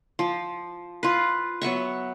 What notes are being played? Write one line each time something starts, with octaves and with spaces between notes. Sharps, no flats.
F3
F4 B4
F#3 B3 E5 C#6